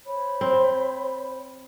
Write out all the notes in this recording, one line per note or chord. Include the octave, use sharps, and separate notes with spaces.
C5 C#5 B5
C4